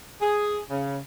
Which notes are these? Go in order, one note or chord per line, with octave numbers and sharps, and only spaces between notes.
G#4
C#3